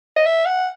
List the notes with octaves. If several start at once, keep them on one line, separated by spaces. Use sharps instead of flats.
D#5
E5
F#5